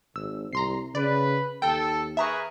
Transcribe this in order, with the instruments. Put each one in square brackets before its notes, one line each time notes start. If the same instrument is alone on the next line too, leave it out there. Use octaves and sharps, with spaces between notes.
[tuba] G#1 [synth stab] E6
[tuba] C2 [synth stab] A#5 C6 C7
[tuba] C#3 [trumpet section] B4 [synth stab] D5
[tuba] D#2 [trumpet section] A4 [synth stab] G5
[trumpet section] G#4 A#4 B4 [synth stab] E5 A#5 C#6